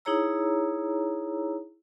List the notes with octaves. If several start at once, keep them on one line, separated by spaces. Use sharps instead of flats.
D#4 E4 G#4 C#5 A#5 E6